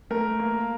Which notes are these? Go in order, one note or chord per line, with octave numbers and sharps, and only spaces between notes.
A3 A#4
A#3